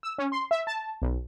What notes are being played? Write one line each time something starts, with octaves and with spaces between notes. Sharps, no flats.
E6
C#4
C6
E5
A5
B1